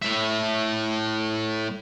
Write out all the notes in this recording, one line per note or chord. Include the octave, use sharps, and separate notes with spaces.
A2 E5